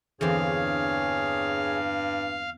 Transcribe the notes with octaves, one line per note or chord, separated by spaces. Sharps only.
E2 G2 D3 C4 G#4 C#5 F5